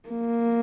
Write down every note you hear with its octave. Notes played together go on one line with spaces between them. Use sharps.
A#3